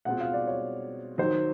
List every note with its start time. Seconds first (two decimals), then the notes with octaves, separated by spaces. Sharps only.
0.05 B2 G#3 C4 F4 F#5
0.20 F5
0.34 D5
0.47 C#5
1.18 D#2 D#3 F#3 C5